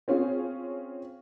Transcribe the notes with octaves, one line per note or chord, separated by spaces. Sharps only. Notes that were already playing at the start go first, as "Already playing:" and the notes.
C4 C#4 F4 G#4